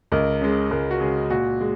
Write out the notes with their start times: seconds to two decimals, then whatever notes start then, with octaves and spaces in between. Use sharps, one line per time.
0.12 C#2 A#4
0.41 C#3 G#3
0.71 C#2 A#4
0.91 F#4
1.01 C#3 G#3 G#4
1.30 A#2 F#4
1.61 G#3